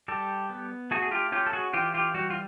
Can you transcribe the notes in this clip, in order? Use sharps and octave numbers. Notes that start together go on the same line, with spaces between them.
G3 G4 A4
B3
A3 F#4 G#4
G#4
F4 G4
C#4 F4 G4
A4
F#4 G#4
E3 F4 G4
F4 G4
G3 F#4
F4